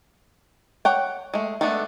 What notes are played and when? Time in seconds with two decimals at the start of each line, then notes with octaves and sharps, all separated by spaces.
0.85 C#5 F#5 G5
1.34 G#3 A3
1.61 G#3 A3 B3 D4 A4